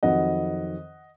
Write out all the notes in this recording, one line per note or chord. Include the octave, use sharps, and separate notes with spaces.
F2 D#3 F#3 D#5 F#5